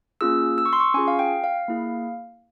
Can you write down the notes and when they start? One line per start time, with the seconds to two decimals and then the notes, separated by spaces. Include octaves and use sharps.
0.21 A#3 C#4 F4 G#4 E6
0.58 E6
0.65 C#6
0.73 C6
0.80 C#6
0.94 C#4 F4 G#4 G#5
1.08 F5
1.19 G5
1.44 F5
1.68 A#3 E4 G#4